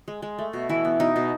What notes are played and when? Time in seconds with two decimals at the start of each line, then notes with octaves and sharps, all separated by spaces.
0.08 G#3
0.22 G#3
0.38 A3
0.53 B2
0.69 E3 E4
0.85 B3
1.00 B2 D#4
1.16 B2